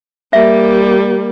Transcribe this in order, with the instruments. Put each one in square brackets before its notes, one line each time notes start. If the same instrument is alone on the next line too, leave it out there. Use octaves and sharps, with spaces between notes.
[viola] G3 A#3 [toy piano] E5